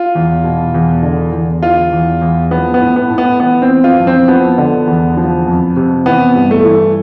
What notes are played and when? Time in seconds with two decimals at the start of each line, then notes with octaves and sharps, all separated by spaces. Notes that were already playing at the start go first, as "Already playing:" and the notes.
Already playing: F4
0.15 E2
0.44 B2
0.74 E2
1.03 D3
1.32 E2
1.62 E3 F4
1.92 E2
2.22 E2
2.51 F3 B3
2.74 B3
2.81 A2
2.96 B3
3.10 A2
3.18 B3
3.40 E3 B3
3.62 C4
3.69 E3
3.84 F4
4.00 F2
4.07 C4
4.28 F3 B3
4.58 D3
4.87 E2
5.17 F3
5.47 F2
5.76 C3
6.06 E3 B3
6.35 G2
6.51 A3
6.65 E3